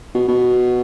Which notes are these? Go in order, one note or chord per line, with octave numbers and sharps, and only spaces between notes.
B2
B2